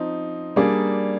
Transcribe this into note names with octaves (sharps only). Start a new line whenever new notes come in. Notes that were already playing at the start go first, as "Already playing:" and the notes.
Already playing: F3 C4 D#4
G3 A#3 D4 G#4 D5